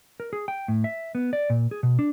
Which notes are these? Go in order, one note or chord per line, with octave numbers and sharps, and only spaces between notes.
A#4
G#4
G5
A2
E5
B3
D5
A#2
G#4
B2
D4